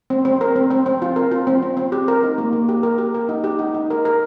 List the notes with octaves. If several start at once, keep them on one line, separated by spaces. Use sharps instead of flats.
C4
C4
A#4
C4
C4
C4
F4
A#4
F4
C4
C4
C4
G4
A#4
D#4
A#3
A#3
G4
A#4
G4
A#4
D#4
G4
D#4
D#4
A#4
A#4